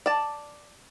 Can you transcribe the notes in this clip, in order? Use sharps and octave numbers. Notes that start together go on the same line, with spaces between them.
D5 A5